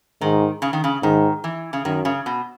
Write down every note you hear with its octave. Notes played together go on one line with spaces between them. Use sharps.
G#2 D#3
C#3
D#3
C#3
G#2 D#3
E3
C#3
F#2 D#3
C#3
B2